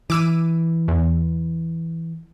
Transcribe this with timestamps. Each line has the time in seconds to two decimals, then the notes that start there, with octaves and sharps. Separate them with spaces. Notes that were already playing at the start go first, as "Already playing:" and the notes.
0.10 E3 D6 E6 D#7
0.88 E2